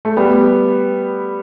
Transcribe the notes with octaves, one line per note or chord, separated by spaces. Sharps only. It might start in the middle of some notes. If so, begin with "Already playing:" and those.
A3
G3 B3